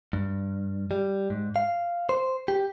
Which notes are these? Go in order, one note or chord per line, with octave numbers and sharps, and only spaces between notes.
G2
G3
G#2
F5
C5
G4